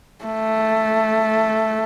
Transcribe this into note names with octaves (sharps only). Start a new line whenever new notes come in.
A3